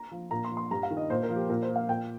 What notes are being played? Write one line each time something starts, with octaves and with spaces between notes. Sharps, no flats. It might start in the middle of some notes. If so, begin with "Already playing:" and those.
Already playing: A#5
F3
A#2 A#5
C6
F3
C6
G2 A#5
F5
D#3
D#5
A#2 C5
A#4
F3
G4
A#2 A#4
C5
F3
F5
A#2 G5